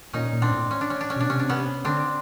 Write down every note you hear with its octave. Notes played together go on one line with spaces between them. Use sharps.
A#2 C#4 D#4
A#2
C4 D4
A2
C#4
D4
C#4
D4
C#4
B2 D4
C3 C#4
D4
B3 C#4
D3 C4 D4